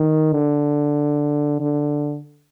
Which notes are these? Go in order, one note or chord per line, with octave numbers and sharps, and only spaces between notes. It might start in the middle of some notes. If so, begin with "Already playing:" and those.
Already playing: D#3
D3
D3